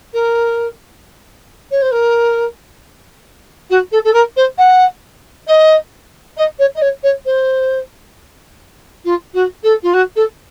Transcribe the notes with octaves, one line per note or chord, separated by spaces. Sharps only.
A#4
C#5
C5
A#4
F#4
A4
A4
A#4
C5
F#5
D#5
D#5
C#5
D#5
C#5
C#5
C5
F4
F#4
A4
F4
F#4
A4